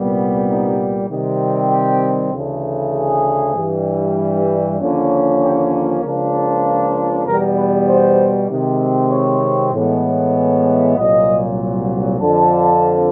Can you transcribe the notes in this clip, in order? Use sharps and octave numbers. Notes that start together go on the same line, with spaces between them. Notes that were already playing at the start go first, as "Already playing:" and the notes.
Already playing: C2 A#2 G3 B3
D#4
C3 D#3 G3 C4
G4
D2 C#3 E3 A3
G#4
G2 E3 G3
D#2 D3 F3 A#3 C#4
G4
A#4
C#2 C#3 F3 A#3 D4
E2 B2 G3 B3 A#4
B4
C5
C3 D#3 G#3 C4
C#5
A2 E3 G#3 B3
C2 A#2 F#3 D#5
F2 D3 F3 A5